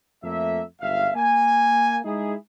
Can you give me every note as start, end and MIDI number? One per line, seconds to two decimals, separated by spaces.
0.23 0.62 41
0.23 0.62 57
0.23 0.62 58
0.23 0.62 76
0.81 1.10 31
0.81 1.10 37
0.81 1.10 76
0.81 1.10 77
1.15 1.99 58
1.15 1.99 80
2.05 2.34 56
2.05 2.34 63
2.05 2.34 64
2.05 2.34 68